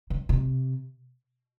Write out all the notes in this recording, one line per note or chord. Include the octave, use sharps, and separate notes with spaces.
C#3
C3